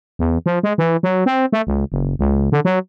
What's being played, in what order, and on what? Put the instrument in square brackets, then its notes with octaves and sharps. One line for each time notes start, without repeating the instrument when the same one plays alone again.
[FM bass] E2
F3
G#3
E3
F#3
C4
A3
C#2
F#1
C#2
D3
F#3